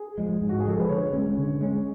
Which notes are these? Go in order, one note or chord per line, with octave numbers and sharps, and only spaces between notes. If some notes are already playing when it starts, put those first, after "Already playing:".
Already playing: G#4
F3 G#3
G#2
F#4
G#4
F3 G#3 A4
B4
D3 C#5
G#3 C#4
D3
G#3 C#4